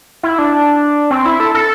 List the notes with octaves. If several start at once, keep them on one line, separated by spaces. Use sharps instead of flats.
E4
D4
C4
E4
A4
A4